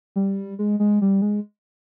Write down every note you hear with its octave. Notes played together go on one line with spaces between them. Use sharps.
G3
G#3
G#3
G3
G#3